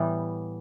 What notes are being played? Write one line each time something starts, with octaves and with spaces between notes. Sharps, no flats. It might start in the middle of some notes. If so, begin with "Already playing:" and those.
Already playing: A2 E3 G3 B3